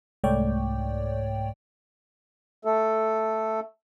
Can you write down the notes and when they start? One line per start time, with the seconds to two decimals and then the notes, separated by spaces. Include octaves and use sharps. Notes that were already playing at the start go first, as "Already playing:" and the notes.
0.24 C2 G#2 A3 C#5 D5 G5
2.65 A3 A4